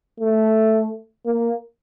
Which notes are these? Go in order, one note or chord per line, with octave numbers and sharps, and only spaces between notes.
A3
A#3